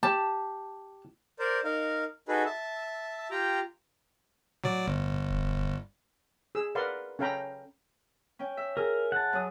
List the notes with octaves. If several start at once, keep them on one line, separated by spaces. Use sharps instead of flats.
G4 A5
A#4 C5 D5
D#4 A#4 F5
D#4 F#4 G#4 A4 B4
E5 A5
F4 G4 G5 A#5
A2 F#3 D5
G1
E1
G#4 E6
A#4 B4 D5 F5 F#5 C6
C#4 A4 F5 G5 A#5 B5
C#4 G5
E5
G#4 A#4
F#5 A5
F#2 D#6